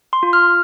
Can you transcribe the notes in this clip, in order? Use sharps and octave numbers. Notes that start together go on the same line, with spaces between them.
C6
F4
F6